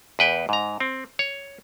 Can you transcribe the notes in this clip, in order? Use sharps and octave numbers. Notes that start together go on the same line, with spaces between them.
E2 B4 G5
G#2 A#5
C4
C#5